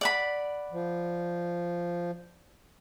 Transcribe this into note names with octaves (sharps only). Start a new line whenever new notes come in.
D5 F#5 B5
F3